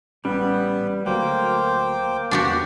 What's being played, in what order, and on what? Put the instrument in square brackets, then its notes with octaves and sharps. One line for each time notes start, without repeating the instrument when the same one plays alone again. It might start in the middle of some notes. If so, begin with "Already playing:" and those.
[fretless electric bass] A1 C#4 [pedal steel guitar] G3 [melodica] B3 B4
[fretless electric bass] D2 F#3 [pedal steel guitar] A#3 [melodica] C5 G5 D6
[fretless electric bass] E2 C3 E3 [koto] D4 F#4 G4